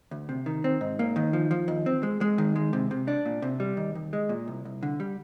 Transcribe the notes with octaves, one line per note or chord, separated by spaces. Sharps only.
D2
C3
D#3
C4
G#2
A#3
D#3
F3
F3
D#2
C4
G#3
G#3
D#3
G#3
C3
C3
D4
A#2
C3
G3
D#2
D#2
G#3
A#2
C2
C2
D3
G3